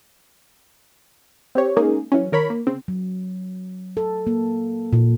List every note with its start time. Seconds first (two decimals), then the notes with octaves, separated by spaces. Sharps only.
1.55 C4 G4 C#5
1.77 G#3 A#3 C#4 D#4 G#4
2.12 E3 F#3 C#4
2.32 D#3 A#4 C#5 B5
2.50 A#3
2.67 C#3 C4
2.88 F#3
3.97 A4
4.27 A#3
4.93 A#2